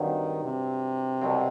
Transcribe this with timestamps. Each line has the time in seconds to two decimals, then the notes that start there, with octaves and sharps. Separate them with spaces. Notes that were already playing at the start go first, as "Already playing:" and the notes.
Already playing: G2 D#3 F#3 C4
0.44 C3
1.22 C2 B2 F#3 C4